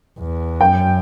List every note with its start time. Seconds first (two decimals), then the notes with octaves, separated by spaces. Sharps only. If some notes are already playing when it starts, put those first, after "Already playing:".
0.19 E2
0.61 F#2 G5